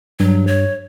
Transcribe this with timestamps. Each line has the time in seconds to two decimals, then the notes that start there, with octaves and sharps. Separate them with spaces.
0.20 G2 F#3
0.47 C#5